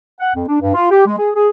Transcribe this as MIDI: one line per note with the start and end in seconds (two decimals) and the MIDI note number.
0.19 0.30 78
0.34 0.43 41
0.48 0.60 62
0.60 0.73 43
0.74 0.88 65
0.91 1.03 67
1.06 1.15 56
1.18 1.30 68
1.34 1.48 68